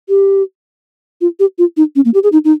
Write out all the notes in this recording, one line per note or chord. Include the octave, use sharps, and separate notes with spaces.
G4
F4
G4
F4
D#4
C#4
A#3
G4
G#4
D#4
D#4